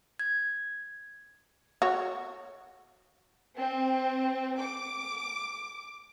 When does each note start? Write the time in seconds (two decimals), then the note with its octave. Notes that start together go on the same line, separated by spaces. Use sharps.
0.19 G#6
1.82 F#4 C#5
3.58 C4
4.61 D6